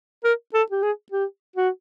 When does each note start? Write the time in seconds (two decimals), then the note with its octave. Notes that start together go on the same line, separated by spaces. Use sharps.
0.24 A#4
0.54 A4
0.71 G4
0.83 G#4
1.12 G4
1.56 F#4